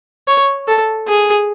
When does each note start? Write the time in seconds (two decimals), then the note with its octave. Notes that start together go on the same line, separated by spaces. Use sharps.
0.28 C#5
0.68 A4
1.08 G#4